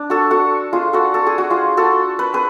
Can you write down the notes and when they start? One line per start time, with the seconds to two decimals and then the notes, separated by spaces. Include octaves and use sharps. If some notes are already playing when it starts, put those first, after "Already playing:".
Already playing: D4
0.10 F#4 A4
0.31 F#4 A4
0.73 F4 G#4
0.93 F#4 A4
1.14 A4
1.27 G#4
1.38 F#4
1.50 F4 G#4
1.77 F#4 A4
2.19 B4
2.34 G#4 B4